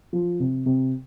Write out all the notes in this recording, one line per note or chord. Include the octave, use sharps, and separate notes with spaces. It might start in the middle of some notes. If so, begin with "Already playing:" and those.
F3
C3
C3